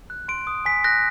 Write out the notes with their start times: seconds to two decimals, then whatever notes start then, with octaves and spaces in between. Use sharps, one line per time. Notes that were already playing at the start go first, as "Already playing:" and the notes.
0.10 F#6
0.28 C6 D7
0.47 D#6
0.66 G#5 B6
0.84 F#6 A#6